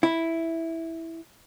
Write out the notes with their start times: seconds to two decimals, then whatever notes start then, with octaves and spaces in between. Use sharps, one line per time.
0.03 E4